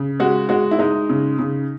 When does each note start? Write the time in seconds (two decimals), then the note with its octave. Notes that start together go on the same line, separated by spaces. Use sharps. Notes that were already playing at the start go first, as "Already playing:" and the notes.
Already playing: C#3
0.20 G#3 F#4
0.49 G#3 F#4
0.71 E4
0.79 G#3 D#4
1.09 C#3
1.39 C#3